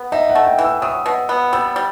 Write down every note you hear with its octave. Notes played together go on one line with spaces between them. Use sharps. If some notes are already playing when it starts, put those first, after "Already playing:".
Already playing: B3
D#4 E5
F#5
A3
G5
E3
E6
F#3 D#6
B2
B3
G3 E6
G3